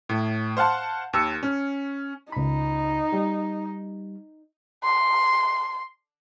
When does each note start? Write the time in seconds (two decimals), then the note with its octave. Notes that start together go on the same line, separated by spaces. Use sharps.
0.09 A2
0.57 C5 F5 F#5 A5 C6
1.13 D#2 E6 C#7
1.43 C#4
2.32 C#2 D#4 B5
3.13 G3
4.84 C6